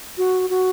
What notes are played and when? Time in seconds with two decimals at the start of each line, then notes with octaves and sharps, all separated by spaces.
0.18 F#4
0.50 F#4